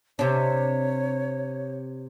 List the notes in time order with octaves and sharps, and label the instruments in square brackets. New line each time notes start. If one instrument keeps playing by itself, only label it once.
[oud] C3 D4 [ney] C#5